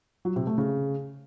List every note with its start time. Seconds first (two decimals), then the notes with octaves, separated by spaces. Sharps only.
0.25 F#3
0.36 C3
0.47 A3
0.58 C#3